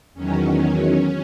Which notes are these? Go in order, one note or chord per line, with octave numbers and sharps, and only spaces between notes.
E2 D#3 F#3 C#4